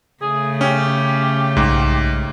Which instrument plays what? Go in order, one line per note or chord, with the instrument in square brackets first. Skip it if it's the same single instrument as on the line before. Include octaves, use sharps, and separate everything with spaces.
[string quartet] C#3 A3 [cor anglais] G#4
[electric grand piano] C#4 [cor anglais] G4
[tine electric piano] B1 [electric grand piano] G#2